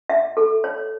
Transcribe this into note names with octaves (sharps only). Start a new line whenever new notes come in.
E5
A4
C#5